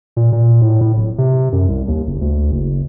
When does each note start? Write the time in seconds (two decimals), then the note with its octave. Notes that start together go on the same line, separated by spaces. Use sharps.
0.17 A#2
0.32 A#2
0.61 A2
0.81 A2
0.96 D1
1.18 C3
1.52 F#2
1.68 C2
1.88 D#2
2.07 F#1
2.21 D2
2.51 F#1